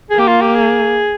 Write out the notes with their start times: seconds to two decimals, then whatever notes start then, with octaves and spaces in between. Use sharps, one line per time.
0.10 A#3 G#4
0.19 G4
0.28 F4
0.41 G4
0.55 G#4